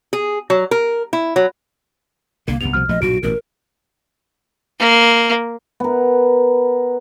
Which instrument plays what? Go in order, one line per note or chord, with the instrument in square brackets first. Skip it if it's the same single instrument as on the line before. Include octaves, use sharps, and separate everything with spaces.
[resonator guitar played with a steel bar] G#4
F#3
A#4
E4
F#3
[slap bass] C2 D3 [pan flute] A#3
[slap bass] C2 G2 [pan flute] B3 [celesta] F7
[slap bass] C2 B2 F3 [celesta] F6
[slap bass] A#1 F3 A3 [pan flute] D#5
[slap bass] B1 G2 A#2 [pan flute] F#4 [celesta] D7
[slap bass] A1 B2 [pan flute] A#4
[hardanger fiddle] A#3
[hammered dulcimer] B3 A#4